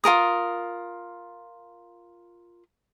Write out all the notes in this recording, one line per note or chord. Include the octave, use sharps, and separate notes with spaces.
F4 A4 A#4 D#6